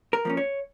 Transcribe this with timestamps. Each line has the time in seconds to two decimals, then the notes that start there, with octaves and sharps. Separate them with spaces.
0.13 A#4
0.25 F3 A#3 C#4
0.37 C#5